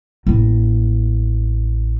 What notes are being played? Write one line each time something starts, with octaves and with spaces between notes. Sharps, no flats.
A1 A#3